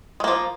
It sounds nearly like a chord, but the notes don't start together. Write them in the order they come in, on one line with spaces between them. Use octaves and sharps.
G#3 A#3 F3